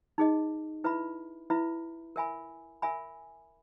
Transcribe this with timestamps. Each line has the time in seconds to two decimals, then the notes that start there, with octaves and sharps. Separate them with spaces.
0.18 D#4 G#4 D#5
0.84 E4 B4 E5 B5
1.50 E4 B4 E5 B5
2.16 A#4 E5 G#5 B5
2.82 A#4 E5 G#5 B5